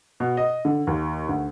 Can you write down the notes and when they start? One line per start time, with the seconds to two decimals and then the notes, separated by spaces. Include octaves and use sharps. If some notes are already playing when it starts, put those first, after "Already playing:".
0.20 B2
0.37 D#5
0.65 D3
0.87 D#2
1.29 D2